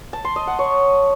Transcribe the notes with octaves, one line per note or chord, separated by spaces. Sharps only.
A5
C6
D#5
F#5
C#5